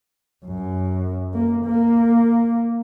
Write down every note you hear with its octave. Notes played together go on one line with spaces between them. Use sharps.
F#2
A#3
A#3